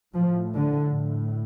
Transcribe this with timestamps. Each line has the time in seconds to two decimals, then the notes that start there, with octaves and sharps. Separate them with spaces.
0.14 A2 F3
0.54 D3
0.94 A2